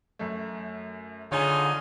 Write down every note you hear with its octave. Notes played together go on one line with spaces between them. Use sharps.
F#2 A3
D3 D#4 F4 G#4 C#5 G#5